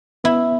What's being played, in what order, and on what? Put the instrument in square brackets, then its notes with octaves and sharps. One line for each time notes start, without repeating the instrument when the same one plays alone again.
[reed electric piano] B3 [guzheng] E4